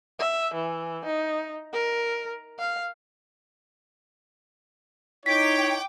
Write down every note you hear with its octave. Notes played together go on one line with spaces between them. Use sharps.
E5
E3
D#4
A#4
F5
D#4 E4 C#5 G5 D6 B6